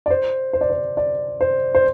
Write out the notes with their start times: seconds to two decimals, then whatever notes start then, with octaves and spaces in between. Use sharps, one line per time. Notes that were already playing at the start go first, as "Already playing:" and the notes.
0.06 D5
0.10 C5
0.53 C5
0.61 D5
0.70 C5
0.97 D5
1.41 C5
1.75 C5